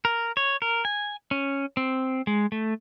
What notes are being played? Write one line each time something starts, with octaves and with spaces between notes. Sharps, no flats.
A#4
C#5
A#4
G#5
C#4
C4
G#3
A3